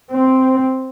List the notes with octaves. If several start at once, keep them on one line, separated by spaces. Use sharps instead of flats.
C4